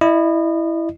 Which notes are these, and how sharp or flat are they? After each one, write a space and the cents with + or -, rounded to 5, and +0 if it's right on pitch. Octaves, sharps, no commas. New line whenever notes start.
E4 +0 D#5 -35